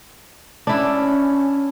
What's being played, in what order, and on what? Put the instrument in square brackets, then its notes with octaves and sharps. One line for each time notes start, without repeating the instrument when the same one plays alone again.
[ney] C#4 [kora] D4 E4